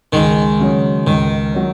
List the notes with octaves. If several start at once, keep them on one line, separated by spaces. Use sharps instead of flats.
C#2 D#3 G#3
C#3 F#3 C#4
C#2 D#3
F#3 C#4